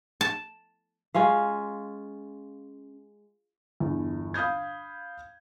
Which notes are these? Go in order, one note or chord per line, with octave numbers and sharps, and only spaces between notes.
A5
G#3 C#4 F4 F5
G1 E2
F5 B5 D#6 G6 G#6